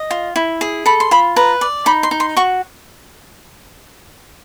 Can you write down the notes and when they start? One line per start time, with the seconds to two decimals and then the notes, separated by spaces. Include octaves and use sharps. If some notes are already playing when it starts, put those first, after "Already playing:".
Already playing: D#5
0.11 F4
0.36 E4
0.61 G#4
0.86 A4 B5
1.00 C6
1.11 F4 B5
1.36 B4 A#5
1.61 D5
1.86 D#4 B5
2.03 C6
2.11 D#4
2.20 C6
2.37 F#4 C#6